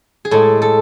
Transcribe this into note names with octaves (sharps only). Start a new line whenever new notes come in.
G#4
A2 G#3 A4
A4